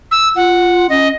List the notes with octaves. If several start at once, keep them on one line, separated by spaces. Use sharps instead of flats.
E6
F4 F#5
C#4 D#5